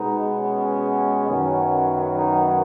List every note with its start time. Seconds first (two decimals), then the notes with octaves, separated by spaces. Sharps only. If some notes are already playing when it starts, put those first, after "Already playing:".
Already playing: B2 G#3 B3 D#4
0.39 C#4
1.28 F#2 D#3 F#3 B3
2.17 D#4